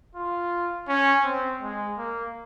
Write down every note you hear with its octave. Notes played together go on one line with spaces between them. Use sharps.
F4
C#4
C4
G#3
A#3